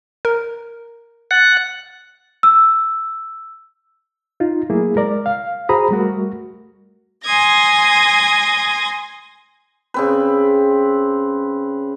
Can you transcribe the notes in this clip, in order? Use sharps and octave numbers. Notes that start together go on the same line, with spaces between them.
A#4
F#5 A6 C#7
E6
D#4 F4
F#3 A3 A#3 E4 G#4
G#3 A#4 D5
F5
F#4 G#4 C5 A#5 B5 D#6
G3 A3 F#4 A#4
G#5 C6 D#6 G#6 A#6
C#3 C4 B4